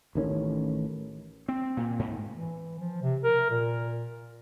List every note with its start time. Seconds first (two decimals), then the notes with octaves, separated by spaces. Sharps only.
0.15 A1 D#3 C4 C#4
1.48 C4
1.77 A#2
1.99 G#2
2.34 E3
2.79 F3
3.02 C3
3.24 A#4
3.50 A#2